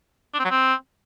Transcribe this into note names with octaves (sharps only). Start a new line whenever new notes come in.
D4
C4
F#3
C4